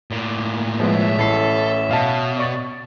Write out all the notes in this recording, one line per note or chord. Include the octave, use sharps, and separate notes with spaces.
A2 A#3
F3 G#3 B3 C#4 E5
A1 E4 A4 C7
B2 F5 A5
D5 C#6 A6